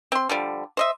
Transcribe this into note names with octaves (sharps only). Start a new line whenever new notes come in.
C4 C6
D3 F3 G3
C5 D#5 E5